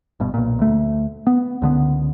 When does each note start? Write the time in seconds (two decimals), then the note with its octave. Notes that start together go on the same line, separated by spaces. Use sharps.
0.20 G1 G2 B2
0.34 B1 A#2
0.59 D2 A3
1.27 B3
1.62 C#2 D3 B3